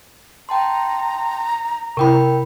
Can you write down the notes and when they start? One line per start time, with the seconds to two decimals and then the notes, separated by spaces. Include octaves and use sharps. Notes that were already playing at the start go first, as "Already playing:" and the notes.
0.49 G5 A5 A#5 C6
1.97 C3 E4 A#4 G5 B5